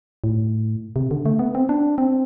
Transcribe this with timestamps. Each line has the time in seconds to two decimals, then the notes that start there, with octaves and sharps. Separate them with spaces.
0.24 A2
0.96 C3
1.11 D3
1.26 A3
1.39 B3
1.55 C4
1.69 D4
1.98 C4